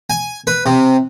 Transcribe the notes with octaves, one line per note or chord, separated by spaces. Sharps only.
G#5
B4
C3